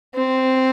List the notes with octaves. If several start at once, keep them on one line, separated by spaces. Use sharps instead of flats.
C4